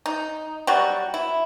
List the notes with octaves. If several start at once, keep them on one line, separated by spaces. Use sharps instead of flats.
D#4
F#3 G3 F#4
E4